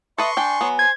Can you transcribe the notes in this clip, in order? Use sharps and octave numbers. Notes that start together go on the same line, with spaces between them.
A4 B4 D#5 E5 C6 C#6
D4 G5 G#5
F#3 B3
C5 G#6